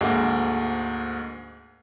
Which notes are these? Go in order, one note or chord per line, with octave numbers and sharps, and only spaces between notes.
D2 G#2 G#3 A#3